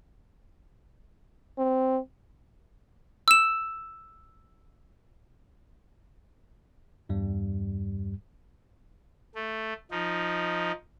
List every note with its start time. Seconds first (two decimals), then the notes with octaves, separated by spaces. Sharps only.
1.58 C4
3.28 E6 E7
7.09 E2 G2 G3
9.35 A3
9.91 F3 D#4